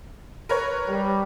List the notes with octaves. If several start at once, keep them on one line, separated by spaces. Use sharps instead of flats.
A#4 B4 C#5
G3